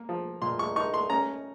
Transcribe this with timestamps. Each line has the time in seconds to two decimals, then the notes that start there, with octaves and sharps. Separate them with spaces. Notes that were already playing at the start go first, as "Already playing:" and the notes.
Already playing: A#3
0.09 F3
0.42 A#2 C6
0.59 C#6
0.76 D#4 C#6
0.94 C6
1.10 C#4 A#5